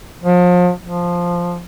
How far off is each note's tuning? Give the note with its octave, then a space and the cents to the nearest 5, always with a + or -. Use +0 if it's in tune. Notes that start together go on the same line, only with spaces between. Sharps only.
F3 +35
F3 +0